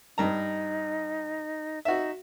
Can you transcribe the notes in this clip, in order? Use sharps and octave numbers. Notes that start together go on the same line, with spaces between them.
G2 D#4 A#5
D#4 F#4 E5